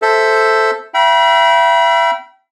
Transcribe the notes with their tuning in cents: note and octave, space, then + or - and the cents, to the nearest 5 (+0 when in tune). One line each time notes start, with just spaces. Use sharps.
A4 +0 C5 +0 E5 +0
E5 +35 G5 -30 B5 -35